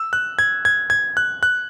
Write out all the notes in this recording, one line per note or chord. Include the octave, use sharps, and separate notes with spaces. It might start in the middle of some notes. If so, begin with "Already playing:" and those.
Already playing: E6
F#6
G#6
G#6
G#6
F#6
F#6